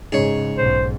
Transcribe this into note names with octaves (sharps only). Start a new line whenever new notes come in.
G#2 C#3 G#3 C#4 D#4 G#4 C#5
B1 G#2 C5